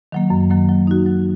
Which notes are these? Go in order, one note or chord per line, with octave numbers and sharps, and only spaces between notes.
D#3 F#3 A#3
F#2
D#3 F#3 A#3
F#3
D#4 F#4
F#3